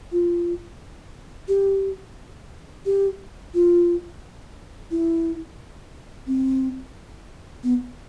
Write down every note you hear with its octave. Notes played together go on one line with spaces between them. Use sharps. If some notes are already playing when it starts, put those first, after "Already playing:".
F4
G4
G4
F4
E4
C4
B3